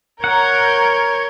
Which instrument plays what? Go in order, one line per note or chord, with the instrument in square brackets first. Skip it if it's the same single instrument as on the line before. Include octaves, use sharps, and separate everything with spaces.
[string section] A#4 G6 [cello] C#5 [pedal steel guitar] F#5